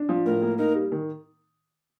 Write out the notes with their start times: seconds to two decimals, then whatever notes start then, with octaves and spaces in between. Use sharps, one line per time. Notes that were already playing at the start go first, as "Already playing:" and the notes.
Already playing: D4
0.09 F3
0.26 A2 A#4
0.42 A#3
0.58 D#4 A#4
0.75 G3
0.92 D#3